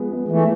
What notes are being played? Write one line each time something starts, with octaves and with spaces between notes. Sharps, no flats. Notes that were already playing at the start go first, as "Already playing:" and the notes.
Already playing: F3 G#3 B3
G#3 B3
E3 A3